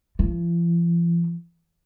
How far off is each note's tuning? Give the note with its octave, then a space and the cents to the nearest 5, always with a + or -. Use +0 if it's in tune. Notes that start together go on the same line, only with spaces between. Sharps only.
F3 -45